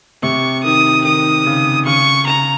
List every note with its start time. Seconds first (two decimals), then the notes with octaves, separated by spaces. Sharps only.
0.23 C3 C#6
0.64 D#3 D#6
1.05 D#3 D#6
1.46 C#3
1.86 C#3 C#6
2.27 A#5